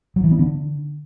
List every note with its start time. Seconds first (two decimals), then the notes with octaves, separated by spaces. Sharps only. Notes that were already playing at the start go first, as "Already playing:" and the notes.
0.16 F#3
0.24 E3
0.31 B3
0.39 D3